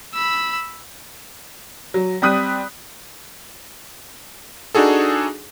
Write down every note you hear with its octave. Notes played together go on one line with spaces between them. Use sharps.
B5 E6
F#3
G3 C4 D#6 F#6 B6 D#7
D4 D#4 F#4 G#4 A4